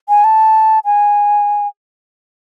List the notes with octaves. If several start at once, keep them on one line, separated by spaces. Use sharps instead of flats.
G#5
A5
G#5